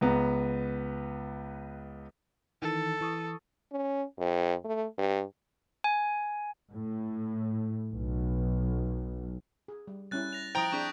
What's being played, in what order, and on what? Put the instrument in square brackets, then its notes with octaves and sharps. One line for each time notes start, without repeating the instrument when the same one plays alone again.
[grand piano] C#2 B3 A#5
[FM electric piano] D#3 E3 [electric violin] A4
[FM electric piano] E3 C#6 D#6
[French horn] C#4
F2
A3
G2
[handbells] G#5
[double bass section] A2
B1
[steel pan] G#4
G3
[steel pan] G3 C#4 E4 [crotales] F#6 A6
[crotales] A#6 F7
[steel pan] F3 E4 C5 [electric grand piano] G5 A#5 [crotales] D#6 D7
[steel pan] C4 D4 G#4 [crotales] C#6 G6 B6